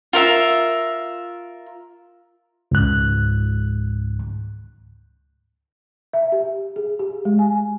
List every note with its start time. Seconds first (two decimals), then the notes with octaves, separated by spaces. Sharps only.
0.13 F4 A#4 E5
2.71 C#2 G#2 F#6
6.14 E5
6.32 G4
6.76 G#4
6.99 G4
7.25 G#3
7.39 G#5